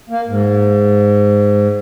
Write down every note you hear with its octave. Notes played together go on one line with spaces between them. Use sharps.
A#3
G#2